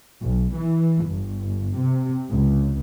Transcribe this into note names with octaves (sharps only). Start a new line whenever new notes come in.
B1
E3
G1
C3
C#2